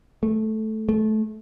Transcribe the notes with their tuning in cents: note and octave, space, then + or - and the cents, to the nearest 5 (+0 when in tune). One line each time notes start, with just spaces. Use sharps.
A3 -10
A3 -20